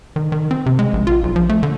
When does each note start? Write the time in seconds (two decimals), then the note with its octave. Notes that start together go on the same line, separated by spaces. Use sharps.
0.16 D#3
0.32 D#3
0.51 C4
0.66 C3
0.79 G#3
0.93 A#1
1.07 F4
1.23 B1
1.36 F3
1.49 A3
1.63 D3